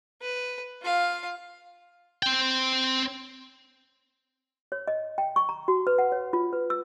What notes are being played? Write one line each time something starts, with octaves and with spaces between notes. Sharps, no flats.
B4
F4 F5
C4 G5
C#5
D#5
G5
C#6
A#5
F#4
B4
F#5
C#5
F4
B4
E6